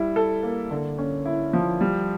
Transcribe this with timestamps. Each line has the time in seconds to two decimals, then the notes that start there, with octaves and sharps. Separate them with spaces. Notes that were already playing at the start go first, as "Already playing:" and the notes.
Already playing: G3 E4
0.16 A4
0.43 A#3
0.71 D3
0.98 C#4
1.25 E4
1.53 F3
1.81 G3